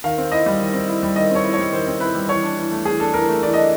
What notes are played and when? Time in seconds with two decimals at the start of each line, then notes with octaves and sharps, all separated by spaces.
0.04 D#3 F5
0.18 C4
0.32 E4 D#5
0.46 G3
0.60 D#3
0.74 C4
0.88 E4
1.03 G3
1.16 D#3 D#5
1.31 C4 C#5
1.44 E4
1.53 C#5
1.59 G3
1.72 D#3 C5
1.87 C4
2.00 E4 B4
2.15 G3
2.29 E3 C#5
2.43 D4
2.57 E3
2.71 A3
2.85 E3 G#4
3.00 D4 A4
3.14 E3 A#4
3.28 A3
3.43 E3 D5
3.54 D4 D#5